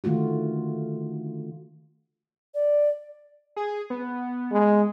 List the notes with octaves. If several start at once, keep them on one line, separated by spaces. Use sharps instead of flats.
D3 D#3 A3 F4 F#4
D5
G#4
B3
G#3